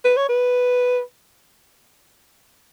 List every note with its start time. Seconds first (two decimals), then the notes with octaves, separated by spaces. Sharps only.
0.05 B4
0.17 C#5
0.29 B4